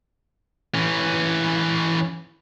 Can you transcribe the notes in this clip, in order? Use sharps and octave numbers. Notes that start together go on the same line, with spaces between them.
E3 C#4